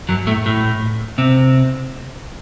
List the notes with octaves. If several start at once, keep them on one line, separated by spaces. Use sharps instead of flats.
F#2 F#3
A2 A3
A2 A3
C3 C4